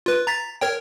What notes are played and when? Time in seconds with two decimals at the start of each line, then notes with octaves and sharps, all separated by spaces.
0.06 F4 B4
0.27 A#5 A6 B6
0.61 A#4 C#5 G5